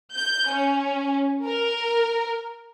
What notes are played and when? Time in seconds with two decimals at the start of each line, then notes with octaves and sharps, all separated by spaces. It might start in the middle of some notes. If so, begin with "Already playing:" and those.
0.13 G6
0.50 C#4
1.43 A#4